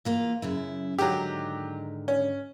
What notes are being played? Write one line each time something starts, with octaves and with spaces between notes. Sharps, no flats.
E3 A#3 F4
F#2 C#3 E4
G#2 D3 D#3 F#3 G4
C#4